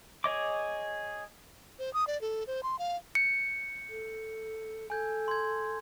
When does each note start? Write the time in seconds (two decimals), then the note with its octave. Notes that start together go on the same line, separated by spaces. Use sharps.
0.24 G#4 C#5 D#5 D6
1.79 C5
1.94 D#6
2.07 D5
2.21 A4
2.47 C5
2.63 C6
2.79 F5
3.15 G6 C#7
3.90 A4
4.90 A4 G#5 G6 G#6
5.28 C6 G#6